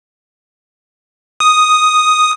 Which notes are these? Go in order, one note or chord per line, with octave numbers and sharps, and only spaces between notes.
D#6